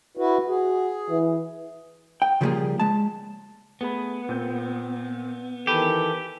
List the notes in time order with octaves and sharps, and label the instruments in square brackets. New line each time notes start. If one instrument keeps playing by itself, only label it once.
[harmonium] E4 F#4 B4
[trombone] F#4 [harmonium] G#4
[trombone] E3
[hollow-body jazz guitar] G5
C#3 F3 G3 G#3 A#3 G#4
G#3 A5
[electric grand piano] A3 G#4 B5 [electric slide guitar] B3
[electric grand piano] A#2 C4 G6
[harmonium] D#3 E3 A4 [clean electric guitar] G4 [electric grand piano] B5 D#7